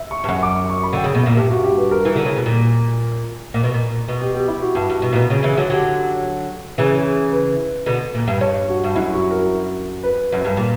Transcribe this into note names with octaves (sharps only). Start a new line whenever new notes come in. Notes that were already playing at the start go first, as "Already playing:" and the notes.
Already playing: E5
C#6
G2
F#2 C#6
D6
C#6
C#6
B5
D3 G5
C#3
B2
A#2 E5
G2 G4
F#4
G4
B4
A#4
E3
D3
C#3
B2
A#2
A#2
B2
A#2
B2
G4
G4
E4
F#4
G2
G2
B2
A#2
B2
C#3
C#3 E3
D3 F#3
D3 F#3 G4
C#3 E3
B4
B2 D3
A#2
G2
G2 C#5
F#4
G2
F#2 E4
F#4
A#4
B4
F#2
G2
A#2